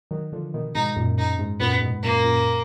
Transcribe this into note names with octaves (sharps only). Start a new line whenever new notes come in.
D#3 F#3
D3 F3
B2 D#3
G#2 B2 D#4
F#2 A#2
F#2 D#4
G#2
F#2 A#2 B3
G#2 B2
F#2 A#2 A#3
F#2 A#2